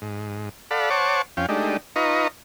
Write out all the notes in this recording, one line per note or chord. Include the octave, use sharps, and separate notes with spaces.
G#2
A4 D5 F5 F#5 B5
C5 C#5 F#5 A5 C#6 D6
F2 C#4 F5 G5
G#3 A3 D4 D#4 G4
D#4 F4 B4 D#5 A#5 C#6